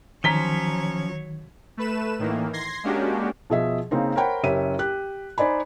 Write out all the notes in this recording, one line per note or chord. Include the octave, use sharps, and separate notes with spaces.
D#3 F3 F#3 C#4 C#5 A#5 B6 G7
A3 B4 E7
A2 D#3 E3 A#3
C6 G#6 A#6 C7
G#3 A#3 C#4 D4 F#4 G4
B2 F3 G#4 D#5 E5
C#3 A#3 C4 D#4
A#4 C5 C#5 F#5 G5 B5
F#1 C#4 G4 E5 D#7
G4 F#6
D#4 C5 D5 G#5 B5